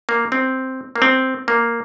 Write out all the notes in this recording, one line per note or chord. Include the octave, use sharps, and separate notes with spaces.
A#3
C4
A#3
C4
A#3